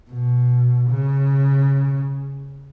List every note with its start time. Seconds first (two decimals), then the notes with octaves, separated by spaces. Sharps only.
0.10 B2
0.90 C#3